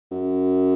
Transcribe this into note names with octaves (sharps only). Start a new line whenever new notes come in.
F#2